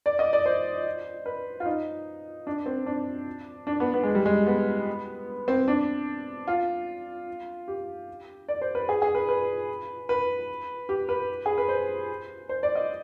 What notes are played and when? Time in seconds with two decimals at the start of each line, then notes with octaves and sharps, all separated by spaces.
0.06 D5
0.19 D#5
0.33 D5
0.46 C5
1.26 B4
1.60 F4
1.66 D#4
2.47 D4
2.66 C4
2.86 D4
3.67 D4
3.80 B3
3.94 B3
4.03 G#3
4.15 G3
4.26 G#3
4.47 B3
5.48 C4
5.68 D4
6.47 F4
7.68 G4
8.49 D5
8.61 C5
8.75 B4
8.89 G#4
9.02 G#4
9.15 B4
9.29 B4
10.09 B4
10.89 G4
11.09 B4
11.46 G#4
11.58 B4
11.68 C5
12.49 C5
12.63 D5
12.75 D#5